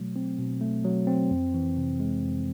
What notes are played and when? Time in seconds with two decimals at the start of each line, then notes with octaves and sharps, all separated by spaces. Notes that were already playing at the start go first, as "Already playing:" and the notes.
Already playing: B2 F#3 A3
0.16 C4
0.39 B2
0.61 A3
0.85 F#3
1.07 C4
1.31 F2
1.54 E3
1.77 C3
2.00 G#3
2.23 F2